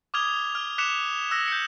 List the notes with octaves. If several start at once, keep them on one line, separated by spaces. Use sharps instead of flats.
D6 D#6 F6 G#6 F7 G7
F6 G7
D6 F#6 B6 C#7 E7 F7
E6 F#6 A#6 F7
G6 C#7